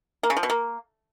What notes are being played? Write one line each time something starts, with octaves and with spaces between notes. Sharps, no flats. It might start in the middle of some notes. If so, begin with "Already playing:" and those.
A#3
C#3
F3
B2
A#3